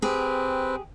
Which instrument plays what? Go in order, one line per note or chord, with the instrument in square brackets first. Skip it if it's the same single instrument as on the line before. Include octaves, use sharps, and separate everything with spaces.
[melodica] C4 B4 [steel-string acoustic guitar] G4 G#4